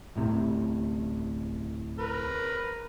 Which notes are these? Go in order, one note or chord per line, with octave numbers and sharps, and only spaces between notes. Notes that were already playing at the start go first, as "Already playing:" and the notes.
D1 A2 C3
A#4 B4